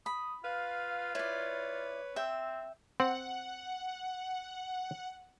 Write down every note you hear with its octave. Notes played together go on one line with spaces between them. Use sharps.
B5 D#6
F4 B4 F5
E4 B4 C#5 D5
C4 E5 G5
C4 F#5